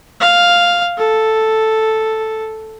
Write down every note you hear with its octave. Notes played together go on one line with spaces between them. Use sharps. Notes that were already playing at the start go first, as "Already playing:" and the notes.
F5
A4